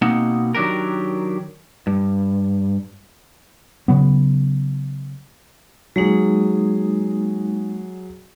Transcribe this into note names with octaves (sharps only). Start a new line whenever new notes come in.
B2 A#3 C4 D#4 F#5
D#3 F#3 D4 G4 A#4
G2
C#3 F#3 B3
F#3 G#3 A#3 D#4 G#4